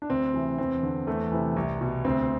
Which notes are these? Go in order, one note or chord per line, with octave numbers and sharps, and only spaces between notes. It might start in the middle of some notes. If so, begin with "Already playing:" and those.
D4
D2 C4
C3 E3
E2 C4
D3
E2 A3
C3 E3
C2
B2
D2 C4